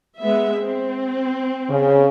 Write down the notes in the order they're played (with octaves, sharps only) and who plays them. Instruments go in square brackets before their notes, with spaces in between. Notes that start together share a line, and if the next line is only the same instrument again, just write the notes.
[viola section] G#3 B3 E5
C4
[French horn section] C#3